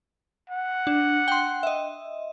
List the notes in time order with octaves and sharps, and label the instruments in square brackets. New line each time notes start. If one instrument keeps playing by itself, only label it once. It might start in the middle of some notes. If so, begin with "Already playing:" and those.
[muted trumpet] F#5
[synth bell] D4
G5 C6
D#5 E5